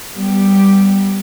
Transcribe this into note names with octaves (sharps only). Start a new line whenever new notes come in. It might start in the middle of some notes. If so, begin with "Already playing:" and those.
G3 B3 G4